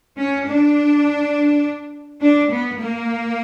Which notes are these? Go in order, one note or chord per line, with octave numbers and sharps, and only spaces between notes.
C#4
D4
D4
B3
A#3